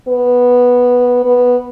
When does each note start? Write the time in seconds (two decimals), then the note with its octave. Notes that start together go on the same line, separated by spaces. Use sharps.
0.08 B3
1.25 B3